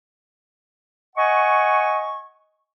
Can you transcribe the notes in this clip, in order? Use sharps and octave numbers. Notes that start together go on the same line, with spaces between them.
D#5 F#5 G#5 C#6